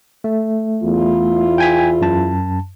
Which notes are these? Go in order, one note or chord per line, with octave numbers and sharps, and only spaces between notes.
A3
E2 E4 F4
G5 G#5 B6
F#2 A5